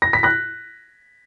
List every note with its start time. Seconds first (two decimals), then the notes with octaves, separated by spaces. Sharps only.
0.02 A#6
0.13 B6
0.23 F#6 A#6